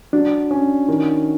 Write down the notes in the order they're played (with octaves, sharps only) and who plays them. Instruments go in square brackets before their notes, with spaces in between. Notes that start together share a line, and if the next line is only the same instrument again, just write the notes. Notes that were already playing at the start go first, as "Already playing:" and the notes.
[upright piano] F#3 [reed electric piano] D4
[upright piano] C#4
D#3